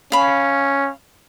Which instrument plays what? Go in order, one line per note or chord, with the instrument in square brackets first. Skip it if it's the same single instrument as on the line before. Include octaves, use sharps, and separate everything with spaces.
[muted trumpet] C#4 [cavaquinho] F5 B5